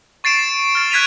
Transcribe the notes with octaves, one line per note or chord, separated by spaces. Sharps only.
C#6 A6 C7 D7 E7
F6 A6
F#6 G#6 B6 D#7 F7